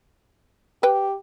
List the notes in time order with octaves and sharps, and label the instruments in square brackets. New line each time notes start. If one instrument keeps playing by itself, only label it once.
[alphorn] G4 [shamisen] B4 G5